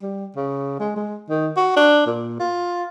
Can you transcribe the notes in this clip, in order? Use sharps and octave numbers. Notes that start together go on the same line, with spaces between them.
G3
C#3
G#3
G#3
D#3
F#4
D4
A#2
F4